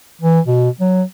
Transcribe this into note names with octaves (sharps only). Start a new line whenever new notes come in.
E3
B2
F#3